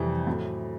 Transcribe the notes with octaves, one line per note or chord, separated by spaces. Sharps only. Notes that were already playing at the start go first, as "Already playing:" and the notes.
Already playing: F2 C3 E3 G3
A2 F#3